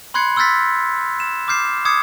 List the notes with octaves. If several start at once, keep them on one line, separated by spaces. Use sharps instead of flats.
B5 C6 F#6 G#6 C7 C#7
C6 E6 F6 G6 A6 B6
E7
D6 F6 G6 C7 E7
D6 D#6 G#6 C7 C#7